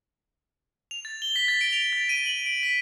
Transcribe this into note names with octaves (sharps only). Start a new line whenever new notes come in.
F7
A6
G7
B6
A6
D7
F7
A6
D#7
F#7
D7
B6